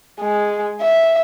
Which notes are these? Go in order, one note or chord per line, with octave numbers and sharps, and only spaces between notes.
G#3
E5